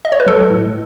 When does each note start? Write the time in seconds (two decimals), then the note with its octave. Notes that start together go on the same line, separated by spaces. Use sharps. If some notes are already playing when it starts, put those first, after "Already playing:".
0.05 D#5
0.12 C#5
0.20 B4
0.27 F#3 A4
0.50 A2